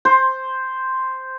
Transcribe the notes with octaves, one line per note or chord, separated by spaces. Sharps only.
C5